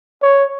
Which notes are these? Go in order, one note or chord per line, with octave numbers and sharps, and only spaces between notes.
C#5